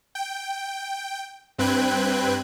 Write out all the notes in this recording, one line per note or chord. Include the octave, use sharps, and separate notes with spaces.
G5
G2 C4 B4 G5 F#6 G#6